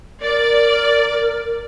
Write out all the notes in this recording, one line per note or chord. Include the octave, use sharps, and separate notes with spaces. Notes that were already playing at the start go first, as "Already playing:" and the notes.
A#4 D5